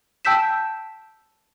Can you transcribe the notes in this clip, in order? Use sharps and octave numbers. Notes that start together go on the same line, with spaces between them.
G5 A5 E6 G6 B6 E7